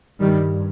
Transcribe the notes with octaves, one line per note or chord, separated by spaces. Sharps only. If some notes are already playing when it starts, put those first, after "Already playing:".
G2 D#3 G3